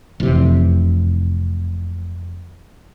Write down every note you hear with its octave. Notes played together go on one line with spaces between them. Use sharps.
F1 E2 C3